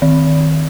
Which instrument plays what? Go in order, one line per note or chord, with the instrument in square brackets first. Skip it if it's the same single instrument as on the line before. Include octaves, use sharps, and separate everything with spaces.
[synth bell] D#3